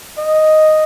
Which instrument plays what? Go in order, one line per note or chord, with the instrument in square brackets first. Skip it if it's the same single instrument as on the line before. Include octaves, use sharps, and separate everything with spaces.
[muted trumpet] D#5